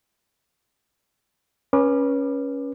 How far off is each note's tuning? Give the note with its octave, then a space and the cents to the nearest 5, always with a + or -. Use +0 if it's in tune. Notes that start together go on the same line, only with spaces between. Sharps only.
C#4 +0 B4 -30 D6 +25